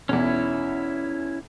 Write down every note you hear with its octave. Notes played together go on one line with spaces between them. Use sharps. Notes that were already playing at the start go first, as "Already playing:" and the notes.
B1 E2 C#4 E4